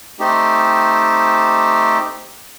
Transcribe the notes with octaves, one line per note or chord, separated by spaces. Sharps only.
A3 C4 D#4 G4